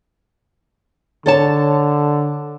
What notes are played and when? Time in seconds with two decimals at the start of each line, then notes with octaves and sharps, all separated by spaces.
1.26 D3 A4 C#5 A5